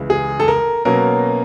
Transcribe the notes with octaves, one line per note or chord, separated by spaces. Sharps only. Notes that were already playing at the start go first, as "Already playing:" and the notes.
Already playing: C#2 C#3 E3
G#4
A4
A#4
B2 F#3 A#3 C#4 A#4